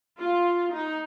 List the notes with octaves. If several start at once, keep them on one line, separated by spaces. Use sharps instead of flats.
F4
D#4